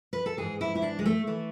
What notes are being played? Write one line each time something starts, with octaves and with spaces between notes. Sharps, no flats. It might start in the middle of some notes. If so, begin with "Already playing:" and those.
B4
A4
G#2 E3 G#4
E4
E4
D4
G#3
A3
E3 A3